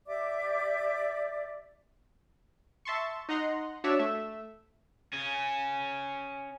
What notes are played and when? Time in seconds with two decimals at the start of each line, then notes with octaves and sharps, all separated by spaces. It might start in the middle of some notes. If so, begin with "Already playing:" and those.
0.07 G4 D5 E5 D6
2.85 E5 A5 C6 C#6
3.29 D#4 D#5 F#5 A#5 C6
3.84 D4 F#4 C#5 D5 E5
3.99 A3 E5
5.13 C#4 G#4